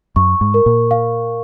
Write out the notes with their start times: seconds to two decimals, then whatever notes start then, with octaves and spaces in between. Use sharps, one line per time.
0.16 F#2 C#6
0.41 G#2
0.54 A#4
0.66 A#2
0.91 F5